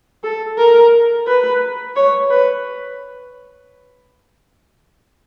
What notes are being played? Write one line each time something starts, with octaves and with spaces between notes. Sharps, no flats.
A4
A#4
B4
C#5
B4